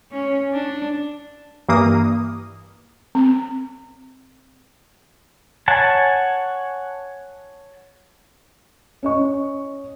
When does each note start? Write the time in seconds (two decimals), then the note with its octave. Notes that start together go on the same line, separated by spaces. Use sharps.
0.12 C#4
0.53 D4
1.69 G2 E3 A#3 D#6
3.15 C4
5.68 C#5 F#5 G#5 A5
9.03 C#4 D#5 C#6